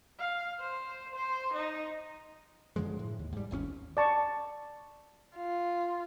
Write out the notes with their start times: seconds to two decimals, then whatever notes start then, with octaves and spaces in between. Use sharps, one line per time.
0.19 F5
0.60 C5
1.15 C5
1.54 D#4
2.76 F#2 D3 F3 G#3
2.99 A2
3.19 D#2
3.33 G#2 G3
3.51 G1 D#2 C4 C#4
3.97 D5 A5 C#6
5.36 F4